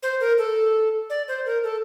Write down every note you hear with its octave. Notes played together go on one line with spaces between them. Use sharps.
C5
A#4
A4
D5
C5
A#4
A4